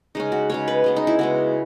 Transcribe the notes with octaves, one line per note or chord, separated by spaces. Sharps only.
C#3 G#3 C#4 D#4
F#4
C#3 G#3 C#4 C#5
B4
C#3 G#3 B3
D#4
E4
C#3 G#3 B3 F#4